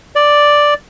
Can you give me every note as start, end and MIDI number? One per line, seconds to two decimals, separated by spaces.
0.16 0.74 74